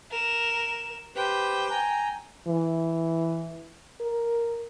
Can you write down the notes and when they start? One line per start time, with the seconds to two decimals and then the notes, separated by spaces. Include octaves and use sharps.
0.11 A#4 E7
1.16 G4 B4 C5 G5
1.70 G#5 A#5
2.48 E3
4.00 A#4